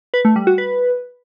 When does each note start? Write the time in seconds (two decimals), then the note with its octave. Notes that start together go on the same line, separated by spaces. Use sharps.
0.14 B4
0.25 A3
0.36 G3
0.47 F#4
0.58 B4